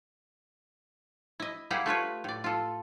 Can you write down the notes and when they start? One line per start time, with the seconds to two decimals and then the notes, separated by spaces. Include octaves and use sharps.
1.40 E4 D#5
1.70 G3 A#3 E4 G4 G#4 F#5
1.86 A3 F4 B4 C#5
2.24 A2 D5
2.44 F4 A4